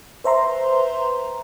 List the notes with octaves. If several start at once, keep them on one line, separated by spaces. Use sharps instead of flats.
B4 C5 E5 A#5 C6